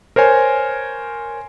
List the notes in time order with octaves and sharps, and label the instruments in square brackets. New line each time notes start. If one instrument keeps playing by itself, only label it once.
[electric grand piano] A#4 C5 C#5 G#5